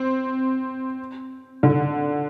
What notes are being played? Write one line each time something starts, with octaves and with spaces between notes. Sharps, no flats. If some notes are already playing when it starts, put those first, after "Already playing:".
Already playing: C4
D3